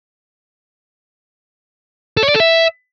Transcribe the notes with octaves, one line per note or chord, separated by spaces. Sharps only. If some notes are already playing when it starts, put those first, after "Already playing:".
A4
C#5
D5
A4
E5